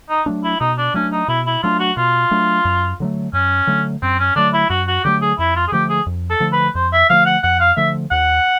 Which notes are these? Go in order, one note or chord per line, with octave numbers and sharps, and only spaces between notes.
D#4
F#3 A3 D4
E4
B2 D#4
D4
F#3 A3 C#4 D4
D#4
B2 E4
E4
F#3 A3 D4 F4
F#4
B2 F4
F#3 A3 D4
F#2
D3 F#3 A3
F#2 C#4
D3 F#3 A3
F#2 C4
C#4
D3 F#3 A3 D4
E4
F#2 F#4
F#4
D3 F#3 A3 G4
G#4
F2 E4
F4
G#4
D3 F3 A3 G4
G#4
F2
A4
D3 F3 A3
B4
F2 C5
E5
D3 F3 A3 F5
F#5
F2 F#5
F5
D3 F3 A3 E5
D#2 F#5